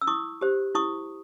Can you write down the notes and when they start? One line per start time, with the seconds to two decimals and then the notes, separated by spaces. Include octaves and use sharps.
0.01 E6
0.07 E4 C#6 D#6
0.41 G4 C5
0.75 E4 C#6 D#6